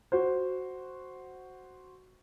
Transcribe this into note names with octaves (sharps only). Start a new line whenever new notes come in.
F#4 C5